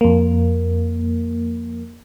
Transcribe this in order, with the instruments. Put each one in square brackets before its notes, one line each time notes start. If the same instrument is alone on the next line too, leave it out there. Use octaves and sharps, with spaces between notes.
[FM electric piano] F2 A#3